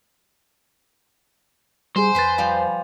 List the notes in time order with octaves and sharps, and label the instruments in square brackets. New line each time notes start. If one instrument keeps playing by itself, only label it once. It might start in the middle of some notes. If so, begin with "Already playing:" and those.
[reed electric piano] G3 G#4 [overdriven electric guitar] C5 [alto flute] G#5
[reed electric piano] F2 A6 [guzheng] B4 C6
[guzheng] F3 G3 F4